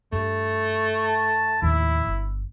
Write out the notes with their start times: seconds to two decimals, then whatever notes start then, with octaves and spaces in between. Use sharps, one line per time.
0.12 G2 A3
1.05 A5
1.62 D#2 A2 F3 E4
2.07 G1